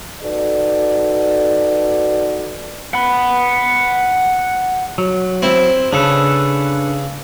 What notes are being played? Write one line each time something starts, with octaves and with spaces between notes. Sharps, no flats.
D#4 F#4 A4 B4 D5
F#5 B5
F#3
C4 E4
C#3 D4 A4 B4